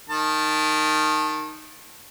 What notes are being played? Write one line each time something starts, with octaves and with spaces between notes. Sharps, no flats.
D#3 A5